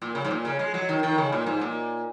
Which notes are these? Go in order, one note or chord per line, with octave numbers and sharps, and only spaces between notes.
A#2
C#3
G#2
A#2
C#3
G#3
F#3
D#3
D#3
C#3
A#2
G#2
A#2